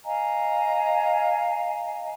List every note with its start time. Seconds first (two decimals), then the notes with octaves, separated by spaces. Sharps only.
0.05 D#5 F5 G#5 A#5